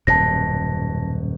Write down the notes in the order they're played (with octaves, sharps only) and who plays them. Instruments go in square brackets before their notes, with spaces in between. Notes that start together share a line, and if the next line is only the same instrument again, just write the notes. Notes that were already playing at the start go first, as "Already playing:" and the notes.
[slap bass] D#1 F#2 B2 [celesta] A5 A#6